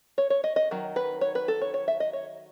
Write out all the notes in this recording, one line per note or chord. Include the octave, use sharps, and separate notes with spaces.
C#5
C#5
D#5
D#5
D#3 F#3
B4
C#5
B4
A4
C#5
C#5
E5
D#5
C#5